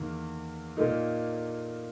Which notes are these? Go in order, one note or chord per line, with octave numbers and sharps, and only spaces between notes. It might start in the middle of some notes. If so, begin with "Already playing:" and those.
Already playing: E2 D#3 A#3
A#2 A#3 D#4